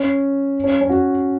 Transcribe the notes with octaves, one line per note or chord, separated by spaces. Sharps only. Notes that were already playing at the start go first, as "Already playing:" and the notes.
Already playing: C#4
C#4
C#4
F#4